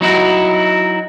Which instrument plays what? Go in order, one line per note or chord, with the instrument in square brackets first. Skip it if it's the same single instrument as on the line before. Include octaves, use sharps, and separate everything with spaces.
[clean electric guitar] F#3 D#4 E4 F#4